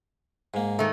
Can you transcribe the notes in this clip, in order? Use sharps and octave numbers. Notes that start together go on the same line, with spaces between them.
G#2 A#3
D#3 A3